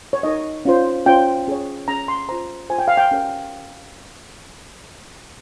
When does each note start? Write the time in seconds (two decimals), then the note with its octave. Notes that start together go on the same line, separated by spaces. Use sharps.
0.13 C#5
0.23 D#4 A#4 C#5 D#5
0.65 C#4 F4 C5
1.06 C#4 F4 C5 G5
1.47 C#4 G#4 C#5
1.88 C#4 G#4 C#5 A#5
2.08 C6
2.29 F4 C5 A#5
2.70 F4 C5 G#5
2.79 G5
2.88 F5
2.97 G5
3.11 C#4 G4 A#4 C#5